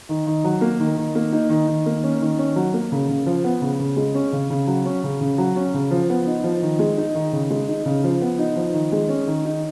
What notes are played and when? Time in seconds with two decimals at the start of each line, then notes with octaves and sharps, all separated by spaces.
0.09 D#3
0.26 D#3
0.44 F#3
0.61 A#3
0.79 D#3
0.97 D#3
1.15 A#3
1.32 D#4
1.49 D#3
1.67 D#3
1.86 A#3
2.03 C#4
2.21 D#3
2.38 C#4
2.56 F#3
2.73 A#3
2.92 C#3
3.09 C#3
3.26 F3
3.44 B3
3.62 C#3
3.80 C#3
3.97 G#3
4.15 C#4
4.33 C#3
4.50 C#3
4.67 F#3
4.85 C#4
5.04 C#3
5.21 C#3
5.38 F#3
5.56 C#4
5.74 C#3
5.91 F3
6.10 B3
6.27 D#4
6.44 F3
6.62 D#3
6.79 G#3
6.98 D#4
7.15 D#3
7.32 C#3
7.50 G#3
7.68 D#4
7.86 C#3
8.04 F3
8.21 B3
8.39 D#4
8.56 F3
8.74 D#3
8.92 G#3
9.09 C#4
9.27 D#3
9.45 D#4